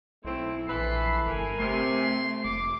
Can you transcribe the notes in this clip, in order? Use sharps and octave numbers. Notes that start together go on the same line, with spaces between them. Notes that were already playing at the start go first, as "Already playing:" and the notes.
B1 A3 C4 E4
A#1 E3 A4 B4 C7
G1 A#4 G#5
C3 A3 C6
F1 D6